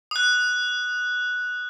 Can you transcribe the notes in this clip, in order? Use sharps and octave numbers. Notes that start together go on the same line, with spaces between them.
D#6 F#6